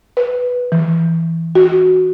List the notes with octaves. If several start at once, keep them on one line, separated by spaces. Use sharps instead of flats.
B4
E3
F#4